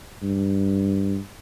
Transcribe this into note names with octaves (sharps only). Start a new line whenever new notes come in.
G2